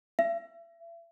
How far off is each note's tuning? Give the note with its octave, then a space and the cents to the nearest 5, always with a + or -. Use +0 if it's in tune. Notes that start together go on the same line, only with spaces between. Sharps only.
E5 +35